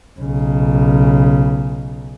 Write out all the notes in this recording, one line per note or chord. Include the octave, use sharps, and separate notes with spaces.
B1 C#3